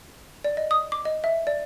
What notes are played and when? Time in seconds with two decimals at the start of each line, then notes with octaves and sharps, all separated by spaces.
0.44 D5
0.57 D#5
0.71 D#6
0.92 D6
1.05 D#5
1.24 E5
1.47 D5